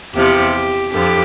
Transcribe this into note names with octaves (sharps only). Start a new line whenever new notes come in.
E2 C3 F3 G4
F2 D3 F3 G4